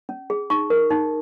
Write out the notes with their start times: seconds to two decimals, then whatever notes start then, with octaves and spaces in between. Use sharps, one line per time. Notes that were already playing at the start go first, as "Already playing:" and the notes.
0.09 C#4
0.30 G#4
0.50 D#4 C#6
0.70 A#4
0.90 D#4